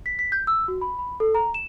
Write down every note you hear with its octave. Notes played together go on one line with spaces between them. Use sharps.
B6
B6
G6
E6
F#4
B5
B5
A4
A#5
E7